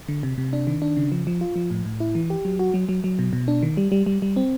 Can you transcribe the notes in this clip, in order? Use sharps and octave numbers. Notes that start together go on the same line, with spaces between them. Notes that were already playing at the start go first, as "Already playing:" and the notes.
D3
C3
C3
D4
D#3
D4
C#3
F3
F3
F4
F3
A2
A2
E4
E3
G4
F#3
F#4
F#3
F#3
F#3
B2
B2
D4
D#3
G3
G3
G3
G3
C4